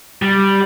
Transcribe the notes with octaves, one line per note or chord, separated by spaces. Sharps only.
G3